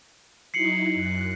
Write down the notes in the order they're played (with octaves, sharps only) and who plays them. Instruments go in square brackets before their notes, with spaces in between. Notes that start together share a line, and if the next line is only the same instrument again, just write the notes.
[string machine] F#3 D#4 E4 [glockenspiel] C7 C#7 F#7
[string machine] F#2 F#6